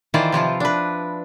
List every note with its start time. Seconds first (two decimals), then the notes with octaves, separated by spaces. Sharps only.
0.14 D#3 E3 E4 F4 C5 D5
0.32 C3 F3 E4 F4
0.60 D4 B4